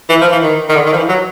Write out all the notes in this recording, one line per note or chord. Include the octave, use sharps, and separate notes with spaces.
E3
F3
E3
D#3
D#3
D3
D#3
F3
E3
F#3